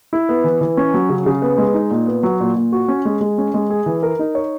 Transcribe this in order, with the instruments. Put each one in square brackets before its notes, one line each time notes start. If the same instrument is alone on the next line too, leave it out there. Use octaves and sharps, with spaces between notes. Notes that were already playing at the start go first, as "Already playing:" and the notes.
[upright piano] E4
B3
E3
E3
C#4
F#3
C#3
C#3
B3
G#3
D#4
A#2
B3
F#3
A#2
A#2
F#4
C#4
G#3
G#3
C#4
G#3
G#4
E3
A#4
D#4
C#5